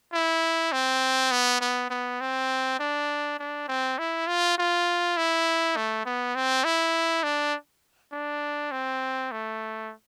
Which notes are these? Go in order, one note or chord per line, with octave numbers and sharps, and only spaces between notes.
E4
C4
B3
B3
B3
C4
D4
D4
C4
E4
F4
F4
E4
A3
B3
C4
E4
D4
D4
C4
A3